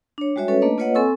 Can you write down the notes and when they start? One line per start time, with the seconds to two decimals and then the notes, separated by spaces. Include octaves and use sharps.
0.18 D4 C#5
0.36 G3 G#3 F#4 C#5 E5
0.48 C#4 A4 B4 C#5
0.62 A3 A#3 D4 B4 D#5
0.78 A#3 F4 B4 C#5 D#5 F#5
0.95 C4 A4 G#5 C#6 E6